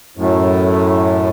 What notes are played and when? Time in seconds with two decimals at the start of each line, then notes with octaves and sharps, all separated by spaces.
0.17 F#2 A2